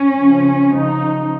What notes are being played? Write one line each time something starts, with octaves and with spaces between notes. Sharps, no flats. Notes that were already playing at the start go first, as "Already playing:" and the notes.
Already playing: C#4
C#3 F3
C#3 F3 D#4